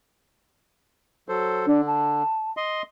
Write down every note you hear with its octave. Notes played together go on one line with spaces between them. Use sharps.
F#3 A4 C5
D3 D4
A5
D#5 C6